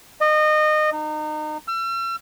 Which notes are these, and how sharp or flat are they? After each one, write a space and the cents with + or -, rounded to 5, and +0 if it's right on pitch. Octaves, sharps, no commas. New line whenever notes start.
D#5 -25
D#4 -30
E6 +40